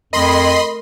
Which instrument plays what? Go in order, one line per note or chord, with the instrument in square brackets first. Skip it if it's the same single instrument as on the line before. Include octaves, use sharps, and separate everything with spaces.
[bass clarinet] F2 [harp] A3 A#4 [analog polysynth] D#5 B5 C6